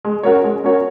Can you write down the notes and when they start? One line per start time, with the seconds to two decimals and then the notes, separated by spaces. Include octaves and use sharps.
0.05 G#3
0.23 C#4 F#4 A#4 C#5
0.44 G#3
0.64 C#4 F#4 A#4 C#5